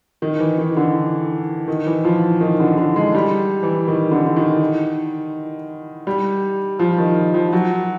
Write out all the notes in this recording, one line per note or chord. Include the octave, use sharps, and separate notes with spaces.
D#3
E3
D#3
D3
D#3
E3
F3
D#3
D3
D3
G#3
G3
E3
D#3
D3
D3
D#3
G3
F3
D#3
F3
F#3